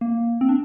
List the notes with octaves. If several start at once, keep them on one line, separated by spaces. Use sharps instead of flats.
A#3
C4
D4